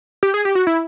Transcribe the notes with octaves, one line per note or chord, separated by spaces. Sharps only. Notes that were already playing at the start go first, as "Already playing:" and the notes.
G4
G#4
G4
F#4
E4